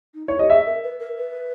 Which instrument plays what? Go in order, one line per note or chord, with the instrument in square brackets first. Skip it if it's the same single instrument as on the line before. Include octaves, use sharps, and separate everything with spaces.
[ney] D#4
[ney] E4 [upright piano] C#5
[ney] G4 [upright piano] D#5
[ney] G#4 [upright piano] E5
[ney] A#4
B4
A#4
B4